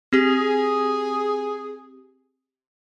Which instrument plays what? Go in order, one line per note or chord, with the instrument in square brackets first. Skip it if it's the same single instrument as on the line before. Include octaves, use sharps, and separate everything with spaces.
[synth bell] C4 G4 [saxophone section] G#4